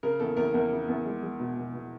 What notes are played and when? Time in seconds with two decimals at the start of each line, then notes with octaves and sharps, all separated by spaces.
0.03 C#3 A#4
0.20 E2 A4
0.37 E2 A#4
0.54 E2 A#4
0.71 C#3
0.88 E2
1.05 G#3
1.22 G#3
1.39 B2
1.57 B2
1.73 B2